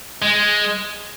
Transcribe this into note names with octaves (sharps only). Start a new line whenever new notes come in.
G#3